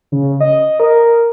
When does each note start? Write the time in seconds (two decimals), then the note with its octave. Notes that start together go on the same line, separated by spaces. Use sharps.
0.12 C#3
0.40 D#5
0.80 A#4